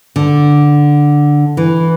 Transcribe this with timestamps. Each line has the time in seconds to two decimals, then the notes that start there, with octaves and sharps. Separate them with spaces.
0.16 D3
1.57 E3